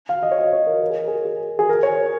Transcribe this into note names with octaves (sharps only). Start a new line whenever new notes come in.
F5
D#5
C#5
D#5
C#5
A#4
A#4
G#4
G#4
G#4
G#4
A#4
C#5